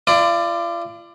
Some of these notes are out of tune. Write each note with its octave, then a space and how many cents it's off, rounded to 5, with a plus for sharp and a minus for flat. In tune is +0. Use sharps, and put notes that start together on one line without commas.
F4 -40 D5 +15